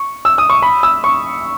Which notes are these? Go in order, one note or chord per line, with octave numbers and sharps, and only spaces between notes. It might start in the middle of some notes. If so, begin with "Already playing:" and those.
Already playing: C#6
E6
D#6
C#6
B5
E6
C#6